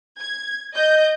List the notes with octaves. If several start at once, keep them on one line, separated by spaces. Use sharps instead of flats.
G#6
D#5 G6